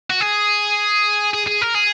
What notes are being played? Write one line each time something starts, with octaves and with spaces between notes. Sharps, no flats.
F#4
G#4
G#4
G#4
A#4
G#4